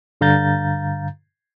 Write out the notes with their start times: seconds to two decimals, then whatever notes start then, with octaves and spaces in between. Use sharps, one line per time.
0.21 G2 D3 F5 A#5 G6 A6